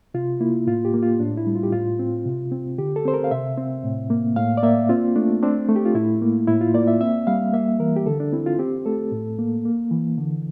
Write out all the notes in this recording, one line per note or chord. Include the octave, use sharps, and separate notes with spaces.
C3 F4
A#3 E4
A2 F4
G4
A#3
F4
A2 D4
E4
G3
F4
G4
A2 F4
C4
C3
C4
D3 G4
A4
C4 C5
A#4
F5
C3 E5
C4
A2
A#3
A2 F5
D5
A#3 E5
C4 F4
A3 D4
C4 D4
A3
G4
F4
A2 E4
A#3
A2 E4
F4
A#3 D5
E5
C4 E5
G3 F5
A#3 E5
E3 A#4
G4
D3 A4
D4
C4 E4
F4
C4 G4
A3 A4
A2
A#3
A#3
E3
D3